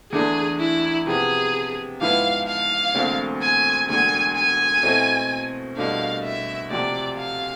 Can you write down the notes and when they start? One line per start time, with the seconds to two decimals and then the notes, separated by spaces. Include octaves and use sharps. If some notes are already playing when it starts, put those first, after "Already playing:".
0.12 E2 D3 A3 D4 G#4 A4
0.60 E4
1.06 C3 F3 B3 G#4
2.01 G#2 F3 B3 E4 B4 F5
2.47 F5
2.95 E1 D2 D3 A3 C4
3.42 G#5
3.88 E1 D2 D3 G#5
4.35 G#5
4.83 B2 A3 C4 E4 A4
5.77 C2 B2 A3 D4 F5
6.24 E5
6.70 D2 C3 F3 D5
7.17 F5